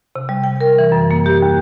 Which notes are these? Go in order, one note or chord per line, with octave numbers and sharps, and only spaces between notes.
C3
G3
G5
A#4
E3
F#2
A#3
G4
D#2